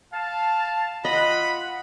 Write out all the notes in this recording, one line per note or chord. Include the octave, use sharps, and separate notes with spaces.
F5 A5
F4 D#5 F5 F#5 B5